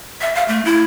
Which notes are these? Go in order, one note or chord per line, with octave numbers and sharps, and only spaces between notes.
E5
F5
A3
E4